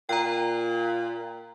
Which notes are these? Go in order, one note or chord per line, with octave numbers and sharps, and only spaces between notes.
A#2 G5 A#5